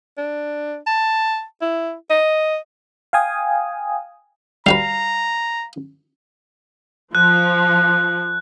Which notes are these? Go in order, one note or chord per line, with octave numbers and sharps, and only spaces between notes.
D4
A5
E4
D#5
F5 G5 G#5 D#6
G3 F#4 B4 F5 A#5
F3 F#6